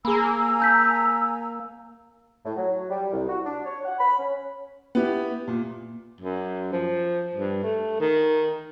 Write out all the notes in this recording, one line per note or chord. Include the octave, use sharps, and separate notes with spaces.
A#3 G#4 G#5 A#5 B5 E6
A5 G6 B6
A2
F#3
G3
C2
F#4
D4
C#5
F#5
B5
C#4
B3 E4 G4
A#2
F#2
F3
G2
A3
D#3